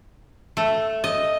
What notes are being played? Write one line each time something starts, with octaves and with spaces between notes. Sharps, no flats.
A3
D#5